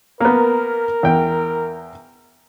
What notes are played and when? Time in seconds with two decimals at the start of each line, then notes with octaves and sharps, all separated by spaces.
0.20 A#3 B3 A#4
1.03 E2 G5